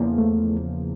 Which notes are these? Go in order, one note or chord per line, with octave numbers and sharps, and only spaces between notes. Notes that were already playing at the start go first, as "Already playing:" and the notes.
Already playing: E2 C#3 F3 A#3
A3